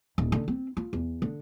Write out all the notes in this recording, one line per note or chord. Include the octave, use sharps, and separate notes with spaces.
D#1
D3 C#4
C4
F4
E2
D3